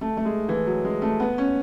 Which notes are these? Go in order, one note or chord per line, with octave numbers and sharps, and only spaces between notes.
A3
A3
G#3
E3
F#3
G#3
A3
B3
C#4